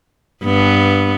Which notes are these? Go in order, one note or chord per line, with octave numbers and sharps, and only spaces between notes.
G2 B3